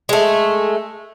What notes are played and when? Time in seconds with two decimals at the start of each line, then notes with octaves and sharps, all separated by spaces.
0.09 G#3 A3